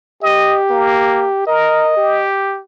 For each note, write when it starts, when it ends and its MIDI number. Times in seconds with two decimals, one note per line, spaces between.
0.22 1.46 67
0.22 0.59 75
0.70 1.28 58
1.47 1.92 70
1.47 2.27 75
1.97 2.60 67